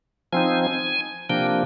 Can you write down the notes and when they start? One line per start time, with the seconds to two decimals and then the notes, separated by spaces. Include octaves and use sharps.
0.33 F3 C4 D#4 G#5
1.29 C3 F3 A#3 D4 G5